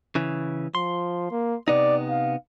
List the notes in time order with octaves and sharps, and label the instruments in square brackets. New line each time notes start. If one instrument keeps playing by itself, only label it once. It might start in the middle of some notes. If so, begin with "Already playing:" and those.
[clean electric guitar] C#3 E3
[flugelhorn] F3 [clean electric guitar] C6
[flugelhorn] A#3
[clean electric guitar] C3 B3 D#4 [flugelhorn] D5
[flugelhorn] F5